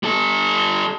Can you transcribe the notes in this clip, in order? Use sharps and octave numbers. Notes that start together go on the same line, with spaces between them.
G3 A4